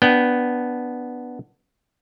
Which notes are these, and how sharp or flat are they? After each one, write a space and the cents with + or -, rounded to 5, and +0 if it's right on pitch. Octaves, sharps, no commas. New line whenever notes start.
B3 +0 D4 +0 G5 -15